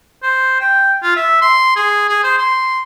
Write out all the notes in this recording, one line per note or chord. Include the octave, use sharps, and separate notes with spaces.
C5
G5
F4
E5
C6
G#4
G#4
C5
C6